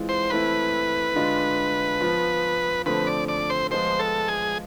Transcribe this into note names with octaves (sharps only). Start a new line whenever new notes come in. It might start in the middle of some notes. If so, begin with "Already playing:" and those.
Already playing: E3 G#3 C4 F4
C5
E3 A3 C4 E4 B4
D3 G#3 D4 F4
F3 B3 F4
D3 F3 A3 C4 B4
D5
D5
C5
F3 G#3 B3 F4 C5
A4
G#4